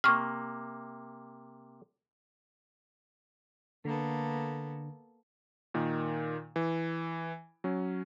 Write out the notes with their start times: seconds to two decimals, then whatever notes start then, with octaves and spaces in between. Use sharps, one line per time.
0.04 C3 A#3 C#6 F6
3.85 D3 A#3 B3 A4
5.74 A#2 D#3
6.56 E3
7.64 F#3 C#4